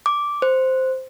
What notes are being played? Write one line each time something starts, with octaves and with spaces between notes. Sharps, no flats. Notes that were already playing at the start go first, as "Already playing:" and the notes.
D6
C5